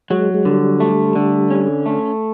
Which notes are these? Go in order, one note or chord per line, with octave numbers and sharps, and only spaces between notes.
F#3 G#3
G#3
D3 G3
A3
D3
C#4
A3